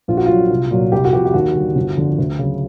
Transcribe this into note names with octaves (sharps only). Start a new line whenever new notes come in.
A#1 F4
F#4
A#2 F#3 F4
C2
A#2 F#3
C2 G4
F#4
C3 F3 G4
G4
D#2 F#4
D3 G3
G1
F2 D3
D2
C#3 F#3